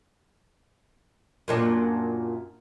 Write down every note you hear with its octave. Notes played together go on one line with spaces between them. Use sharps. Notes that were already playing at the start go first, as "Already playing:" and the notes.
F#2 A#2 D4